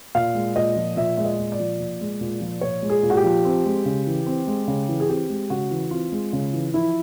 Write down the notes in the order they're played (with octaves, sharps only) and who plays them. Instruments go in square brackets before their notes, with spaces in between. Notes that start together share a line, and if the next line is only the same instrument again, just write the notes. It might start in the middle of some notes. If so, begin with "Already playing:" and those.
[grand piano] A#2 F5
G#3
A#2 D#5
F3
A#2 E5
G#3 E5
D#5
A#2
D5
F3
A#2
G#3
A#2
F3
A#2 C#5
G#3
G#4
A#2
F#4
G4
F3
C4
G#3
C#3
E3
C4
G#3
C#3
E3
G#4
C4 G4
G#3
C#3 F#4
E3
C4 F4
G#3
C#3
E3
F3 E4